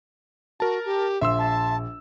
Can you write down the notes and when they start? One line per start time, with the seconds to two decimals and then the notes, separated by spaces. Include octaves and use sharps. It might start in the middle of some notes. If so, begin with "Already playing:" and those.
0.60 F#4 A#4 A5
0.85 G4
1.21 A#1 E5 C6 E6
1.39 A5